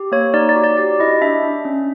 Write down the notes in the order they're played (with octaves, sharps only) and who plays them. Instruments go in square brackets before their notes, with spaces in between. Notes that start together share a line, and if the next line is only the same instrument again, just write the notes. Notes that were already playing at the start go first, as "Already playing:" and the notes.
Already playing: [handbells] G4
A#3 C#5
D#4 D5
D5
F#4
D5
G4 D5
E4 D#5
D4 E5
D4
C#4